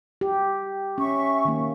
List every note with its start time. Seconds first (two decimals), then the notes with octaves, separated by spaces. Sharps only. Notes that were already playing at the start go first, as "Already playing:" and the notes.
0.21 G4
0.98 C#4 E5 C#6
1.45 D#3 A#3